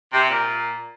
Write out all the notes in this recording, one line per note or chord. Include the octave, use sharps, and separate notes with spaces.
C3
A#2